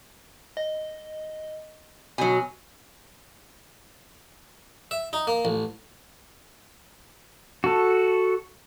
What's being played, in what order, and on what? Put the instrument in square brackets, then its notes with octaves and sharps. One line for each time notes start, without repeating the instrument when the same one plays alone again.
[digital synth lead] D#5
[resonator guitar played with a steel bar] B2 F#3 [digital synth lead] G#5
[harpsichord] E5
D#4
A#3
A1
[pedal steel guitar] F#4 A4